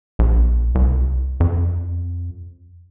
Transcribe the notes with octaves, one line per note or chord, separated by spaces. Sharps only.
A#1
C2
F2